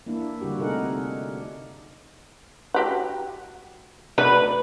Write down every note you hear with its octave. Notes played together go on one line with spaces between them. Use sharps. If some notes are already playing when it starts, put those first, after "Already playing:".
A#3 D4 E4
D3 G3 F#4 G4
C3 A3 D#4 G#4 A#4 F#5
F#4 G4 F#5
F#3 A3 B4 D5